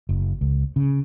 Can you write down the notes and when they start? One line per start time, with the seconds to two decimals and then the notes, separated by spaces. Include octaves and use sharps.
0.09 F#1
0.41 C#2
0.76 C#3